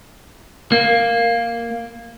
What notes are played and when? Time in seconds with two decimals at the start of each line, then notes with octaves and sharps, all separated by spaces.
0.72 A#3